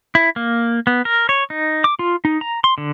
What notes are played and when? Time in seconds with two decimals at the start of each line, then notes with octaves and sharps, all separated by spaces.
0.15 E4
0.36 A#3
0.87 B3
1.05 A#4
1.29 C#5
1.50 D#4
1.84 D6
1.99 F4
2.25 D#4
2.41 A#5
2.64 C6
2.78 D3